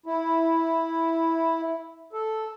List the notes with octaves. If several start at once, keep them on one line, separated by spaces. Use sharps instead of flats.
E4
A4